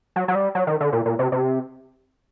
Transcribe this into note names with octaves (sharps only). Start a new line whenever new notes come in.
F#3
F#3
G3
F#3
D#3
D3
A#2
A#2
C3
C3